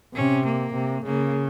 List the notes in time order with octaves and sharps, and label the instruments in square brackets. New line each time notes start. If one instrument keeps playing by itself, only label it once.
[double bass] C3 [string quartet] C#4
[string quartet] A#3
[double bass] C3
[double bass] C#3 [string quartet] A#3